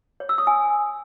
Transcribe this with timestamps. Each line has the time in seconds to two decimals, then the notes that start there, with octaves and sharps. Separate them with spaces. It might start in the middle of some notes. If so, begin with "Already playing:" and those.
0.20 C#5
0.29 E6
0.38 D#6
0.47 G#5